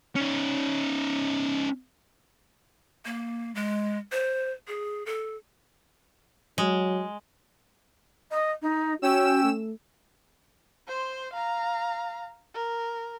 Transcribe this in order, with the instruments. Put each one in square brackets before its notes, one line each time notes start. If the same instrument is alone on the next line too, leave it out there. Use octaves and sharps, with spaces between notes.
[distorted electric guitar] C#4 D#4
[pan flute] A#3
G#3
C5
G#4
A4
[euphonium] F#3 [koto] G#3
[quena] D#5
D#4
[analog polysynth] C#4 E6 E7 [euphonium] F#4 [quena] G5
[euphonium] A3
[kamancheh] C5 C6
F5 A#5
A#4